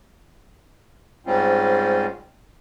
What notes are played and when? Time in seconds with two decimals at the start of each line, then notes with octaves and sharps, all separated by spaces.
1.26 G#2 G3 G#3 C4 C#4 F4